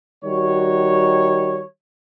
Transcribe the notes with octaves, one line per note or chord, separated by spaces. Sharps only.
D#3 G3 F#4 C#5